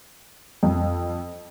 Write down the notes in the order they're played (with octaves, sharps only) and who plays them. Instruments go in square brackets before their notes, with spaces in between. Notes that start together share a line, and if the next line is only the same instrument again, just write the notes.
[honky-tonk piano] F2